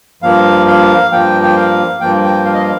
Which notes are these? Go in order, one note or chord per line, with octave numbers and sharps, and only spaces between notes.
G2 F3 A#3 F5
F5
G2 F3 A#3 G5
G5
F5
G2 F3 A#3 G5
G5
F5
D#5
F5